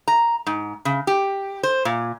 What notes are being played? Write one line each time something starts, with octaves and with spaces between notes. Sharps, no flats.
A#5
G#2
C#3
G4
C5
A#2